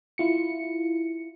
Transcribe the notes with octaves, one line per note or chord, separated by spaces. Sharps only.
E4 F4 C#7